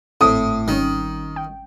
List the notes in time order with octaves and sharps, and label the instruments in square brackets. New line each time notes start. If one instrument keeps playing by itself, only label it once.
[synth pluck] G#1 C4 [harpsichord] A2 [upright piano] D#6
[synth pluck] G#1 G3 C#4 [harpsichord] D#3
[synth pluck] G5